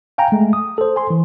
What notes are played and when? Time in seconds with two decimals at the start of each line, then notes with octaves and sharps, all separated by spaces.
0.18 F5 G5 G#5 A#5
0.32 G#3 A3
0.53 D#6
0.78 A4 C5
0.96 G#5 C6
1.10 E3